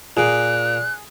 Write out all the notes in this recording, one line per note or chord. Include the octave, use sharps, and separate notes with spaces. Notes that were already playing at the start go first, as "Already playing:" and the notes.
A#2 G#4 F#6